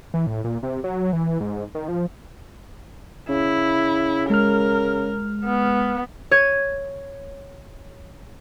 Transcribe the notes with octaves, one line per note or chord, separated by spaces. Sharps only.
E3
A2
A#2
C3
F#3
E3
G#2
D#3
F3
C#3 E4
G#3 A#4 F6
B3
C#5 G#6 D#7